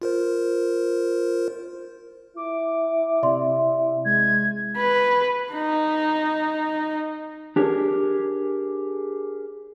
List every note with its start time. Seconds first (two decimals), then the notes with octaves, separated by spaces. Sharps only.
0.02 F4 A#4 C5
2.36 E4 D6
3.23 C3 D5 E5 C6
4.05 G#3 G#6
4.77 B4
5.53 D#4
7.56 D4 G4 G#4 A#4 C#5